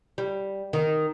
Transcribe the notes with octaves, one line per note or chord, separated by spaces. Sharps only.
G3
D#3